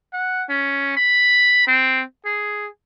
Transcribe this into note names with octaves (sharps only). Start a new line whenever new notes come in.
F#5
C#4
B5
C4
G#4